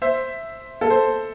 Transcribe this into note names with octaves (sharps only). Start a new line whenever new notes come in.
C5 E5
A4
C5